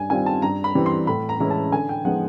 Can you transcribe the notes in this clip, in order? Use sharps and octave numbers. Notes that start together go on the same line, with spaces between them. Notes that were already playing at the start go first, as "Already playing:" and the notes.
Already playing: G2 G#5
D#3 G3 C4 F4 G#5
A5
G2 A#5
B5
E3 G3 C4
C6
A2 B5
A#5
E3 G#3 C#4 E4 A#5
A5
D3 G#5
G5
F3 G#3 B3 D#4 F#5